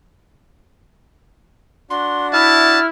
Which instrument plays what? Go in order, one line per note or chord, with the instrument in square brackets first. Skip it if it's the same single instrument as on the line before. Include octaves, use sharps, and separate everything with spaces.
[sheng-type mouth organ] D4 F#4 [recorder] C6
[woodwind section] E4 [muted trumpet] A5 [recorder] F6